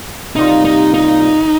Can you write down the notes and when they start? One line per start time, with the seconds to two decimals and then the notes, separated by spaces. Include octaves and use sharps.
0.36 C3 G3 A#3 D#4 F4
0.65 D#4
0.94 D#4